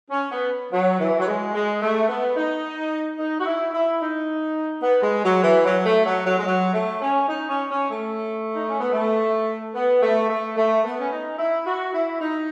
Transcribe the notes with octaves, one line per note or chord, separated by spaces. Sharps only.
C#4
B3
F#3
E3
F#3
G#3
G#3
A3
B3
D#4
D#4
F#4
E4
E4
D#4
B3
G#3
F#3
E3
F#3
A3
F#3
F#3
G#3
F#3
A3
C#4
D#4
C#4
C#4
A3
D#4
C#4
B3
A3
B3
A3
A3
A3
B3
C#4
D#4
E4
F#4
E4
D#4